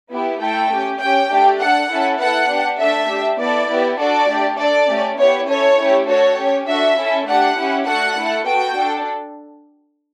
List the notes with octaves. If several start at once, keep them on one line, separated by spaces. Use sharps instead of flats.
B3 E4 G4
A3 E4 A4 G5
C#4 G4
C#4 G4 G5
A3 D4 G4
D4 A4 F#5
C#4 E4 A4
B3 E4 A4 F#5
D4 G4
A3 D4 A4 E5
D4 G4
B3 E4 A4 D5
B3 E4 G4
D4 F#4 A4 D5
A3 D4 G4
D4 A4 D5
A3 C#4 G4
B3 E4 G4 C#5
C#4 E4 A4 C#5
A3 C#4 E4 G4
D4 F#4 A4 C#5
C#4 G4
D4 F#4 A4 E5
C#4 E4 A4
A3 D4 G4 F#5
C#4 E4 G4
A3 D4 F#4 A4 F#5
A3 E4 A4
B3 F#4 A4 G5
D4 A4